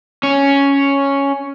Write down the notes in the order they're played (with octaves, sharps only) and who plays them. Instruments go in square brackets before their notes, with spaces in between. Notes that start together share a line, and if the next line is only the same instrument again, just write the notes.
[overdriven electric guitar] C#4